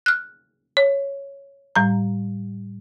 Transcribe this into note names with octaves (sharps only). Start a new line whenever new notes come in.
F6 F#6
C#5
A2 G3 A#5